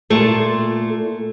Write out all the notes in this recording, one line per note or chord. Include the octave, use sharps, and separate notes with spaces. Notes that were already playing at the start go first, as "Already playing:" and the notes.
A#2 A3 F4